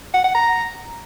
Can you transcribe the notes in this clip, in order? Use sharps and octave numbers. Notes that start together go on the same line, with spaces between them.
F#5
F#5
A#5